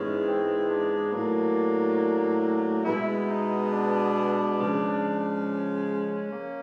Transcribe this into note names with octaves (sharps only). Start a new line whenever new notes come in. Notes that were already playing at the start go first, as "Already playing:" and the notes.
Already playing: G#2 E3 G#3 B3 C#4
C4
D4
A2 F#3 A#3
B2 G#3 B3 E4
D#4
D4
C#3 F3 G#3
C#4
A#3